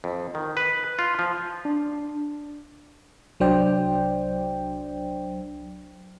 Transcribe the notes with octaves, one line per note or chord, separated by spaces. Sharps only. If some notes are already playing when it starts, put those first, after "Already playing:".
F2
D#3
B4
F4
F3
D4
C2 F#3 D4 C5 D5 G5